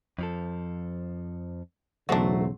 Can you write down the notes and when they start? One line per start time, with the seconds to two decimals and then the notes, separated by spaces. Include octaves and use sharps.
0.19 F2 F3 A4
2.09 B1 E2 C#3 F#3 A3 D4 F#4 C5